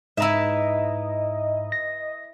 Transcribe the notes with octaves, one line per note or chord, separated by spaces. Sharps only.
G#2 E4 B4 D#5 E5 A#5
A#6